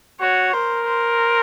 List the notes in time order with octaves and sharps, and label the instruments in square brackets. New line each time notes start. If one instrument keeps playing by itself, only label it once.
[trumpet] F#4 [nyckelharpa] C#5
[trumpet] A#4 [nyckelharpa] C5
[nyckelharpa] C5